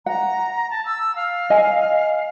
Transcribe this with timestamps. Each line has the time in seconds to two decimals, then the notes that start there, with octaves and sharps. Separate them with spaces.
0.06 F#5 A#5
0.71 A5
0.86 E6
1.16 F5
1.50 D#5 G#5